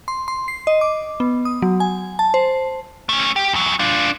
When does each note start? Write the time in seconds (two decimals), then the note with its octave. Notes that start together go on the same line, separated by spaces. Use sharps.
0.08 C6
0.28 C6
0.48 C7
0.67 D#5
0.81 D6
1.20 B3
1.45 D#6
1.62 F#3
1.80 G#5
2.19 A5
2.34 C5
3.09 A3 C#4
3.36 G4
3.53 E2 F#3
3.79 D4 F4